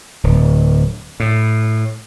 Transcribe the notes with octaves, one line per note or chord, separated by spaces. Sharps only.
D1
A2